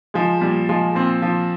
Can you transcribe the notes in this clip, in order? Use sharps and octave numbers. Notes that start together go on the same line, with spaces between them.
F3 G#3
A#2 G3
F3 G#3
A#2 C4
F3